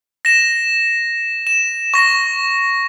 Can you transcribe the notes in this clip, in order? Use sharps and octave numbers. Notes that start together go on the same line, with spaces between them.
A#6 E7
E7
C#6 A#6